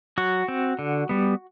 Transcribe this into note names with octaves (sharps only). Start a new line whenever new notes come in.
F#3 F#4
C4
D3
G3 B3